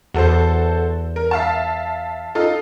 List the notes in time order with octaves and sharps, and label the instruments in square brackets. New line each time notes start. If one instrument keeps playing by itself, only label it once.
[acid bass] E2 [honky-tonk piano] F#4 A4 C5
[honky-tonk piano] A#4
E5 F5 A5
D#4 F4 A4